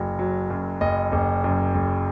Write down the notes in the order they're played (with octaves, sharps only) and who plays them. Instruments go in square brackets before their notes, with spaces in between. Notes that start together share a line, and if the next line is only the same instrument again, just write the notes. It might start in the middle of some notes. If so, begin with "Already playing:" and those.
Already playing: [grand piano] F#1 F#3
F#3
F#2
F#1 D#5
F#1
F#2
F#1